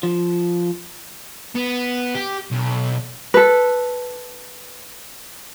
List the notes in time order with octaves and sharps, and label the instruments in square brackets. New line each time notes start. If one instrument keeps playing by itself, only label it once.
[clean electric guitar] F3
[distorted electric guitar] B3
G4
B1
[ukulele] A4 B4